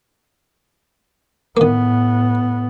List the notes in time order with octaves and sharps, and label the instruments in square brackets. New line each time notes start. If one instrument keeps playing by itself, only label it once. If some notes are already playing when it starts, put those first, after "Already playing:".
[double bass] A2 B3 [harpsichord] D#3 A#3